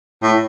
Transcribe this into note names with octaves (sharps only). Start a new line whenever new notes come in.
A2